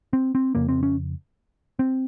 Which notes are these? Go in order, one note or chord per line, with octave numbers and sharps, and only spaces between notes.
C4
C4
F2 C#3 A#3
C4
C#4
C4